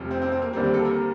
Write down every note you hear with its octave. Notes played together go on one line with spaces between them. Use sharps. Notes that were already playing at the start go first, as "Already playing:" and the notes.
Already playing: F1 F2 C3
C4
C4
C4
A#3
D#2 D3 G3 A#3 C4
C4
A4
A#4